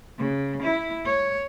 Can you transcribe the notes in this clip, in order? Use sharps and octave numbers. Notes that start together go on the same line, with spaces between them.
C#3
E4
C#5